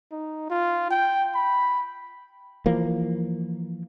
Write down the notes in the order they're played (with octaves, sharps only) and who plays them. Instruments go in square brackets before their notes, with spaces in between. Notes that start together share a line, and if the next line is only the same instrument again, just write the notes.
[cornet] D#4
F4
G5
B5
[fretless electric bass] E3 F3 A#3